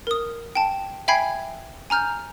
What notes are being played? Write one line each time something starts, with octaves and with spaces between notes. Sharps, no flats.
A#4 D#6
G5 A5
E5 G5 G#5 B5 G#6 C7
G#5 A#5 F6 G6